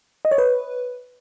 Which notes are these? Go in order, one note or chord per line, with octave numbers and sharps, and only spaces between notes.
D#5
C#5
B4